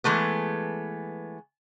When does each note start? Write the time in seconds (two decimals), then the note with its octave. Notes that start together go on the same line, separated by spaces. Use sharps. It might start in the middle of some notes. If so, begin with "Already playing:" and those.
0.04 E3 G#3 A3 B3